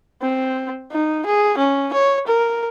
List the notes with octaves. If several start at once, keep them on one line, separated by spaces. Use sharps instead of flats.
C4
D#4
G#4
C#4
C#5
A#4